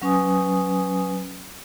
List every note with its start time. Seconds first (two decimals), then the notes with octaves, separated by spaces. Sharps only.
0.02 F#3 C#4 B4 G#5 D#6